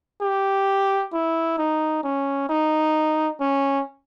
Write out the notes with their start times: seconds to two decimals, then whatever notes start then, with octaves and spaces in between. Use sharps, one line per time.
0.22 G4
1.13 E4
1.58 D#4
2.04 C#4
2.49 D#4
3.40 C#4